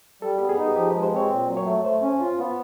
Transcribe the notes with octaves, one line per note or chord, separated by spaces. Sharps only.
G3 A4
B3 G4
G#4
D#4
F3 G4
B4
G#3
C5
C4 C#5
A#2
F#3
C#5
A3
A3 C5
C#4
F4
B3